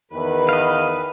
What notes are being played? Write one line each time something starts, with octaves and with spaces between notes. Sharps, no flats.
E2 D#3 B4
D#5 F5